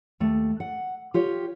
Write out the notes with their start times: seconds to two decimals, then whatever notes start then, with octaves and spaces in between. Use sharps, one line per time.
0.20 D#2 A3
0.60 F#5
1.14 F4 G4 C#5